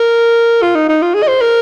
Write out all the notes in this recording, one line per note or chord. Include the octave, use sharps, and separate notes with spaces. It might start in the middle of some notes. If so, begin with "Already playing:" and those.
Already playing: A#4
F4
D#4
D#4
F4
G#4
D#5
C5
A#4